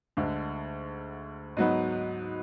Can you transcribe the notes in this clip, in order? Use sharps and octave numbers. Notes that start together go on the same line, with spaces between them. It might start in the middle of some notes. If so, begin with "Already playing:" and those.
D2 D3 G#3
G#2 F#3 B3 D#4